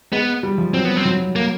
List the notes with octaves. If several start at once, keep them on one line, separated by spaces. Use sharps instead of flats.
G#3 B3
G3
F3
F#3 C4
B3
C4
F#3
A#3